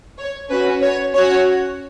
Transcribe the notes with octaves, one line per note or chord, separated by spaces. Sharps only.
C#5
C#4 F#4 B4
C#5
C#4 F#4 C#5